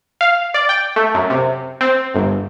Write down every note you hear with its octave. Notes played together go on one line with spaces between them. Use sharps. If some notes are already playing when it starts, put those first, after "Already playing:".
F5
D5
G5
A3
F#2
C3
C4
G1